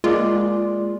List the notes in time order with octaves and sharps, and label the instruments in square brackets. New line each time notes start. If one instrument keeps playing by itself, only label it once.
[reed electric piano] G#3 A#3 D5 [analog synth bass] F4